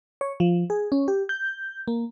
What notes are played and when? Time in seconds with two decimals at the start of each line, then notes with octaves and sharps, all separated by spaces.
0.21 C#5
0.40 F3
0.70 G#4
0.92 C#4
1.08 G4
1.29 G6
1.88 A#3